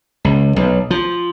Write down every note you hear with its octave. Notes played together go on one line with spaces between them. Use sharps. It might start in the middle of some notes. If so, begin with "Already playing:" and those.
C#2
B1
F3